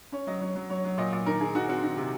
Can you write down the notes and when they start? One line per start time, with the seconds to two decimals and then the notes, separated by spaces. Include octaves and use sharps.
0.12 C#4 C#5
0.27 F#3 D#5
0.41 F#3 C#5
0.55 F#3
0.69 F#3 C#5
0.84 F#3
0.98 A#2 D#5
1.12 A#2
1.26 D#3 A#4
1.40 D#3 G#4
1.55 D#3 F#4
1.68 C4 F#4
1.83 D#3
1.97 C3